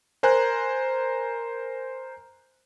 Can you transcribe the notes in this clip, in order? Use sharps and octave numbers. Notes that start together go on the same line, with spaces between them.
A#4 C5 G#5 A#5 F#6